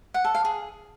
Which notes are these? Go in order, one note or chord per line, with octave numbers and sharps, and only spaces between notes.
F#5
A4
F5
G#4